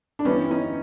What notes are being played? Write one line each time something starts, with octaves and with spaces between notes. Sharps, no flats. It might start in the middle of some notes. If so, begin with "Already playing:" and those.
D4
G2 E3 G3 B3 C#4
C#4 D#4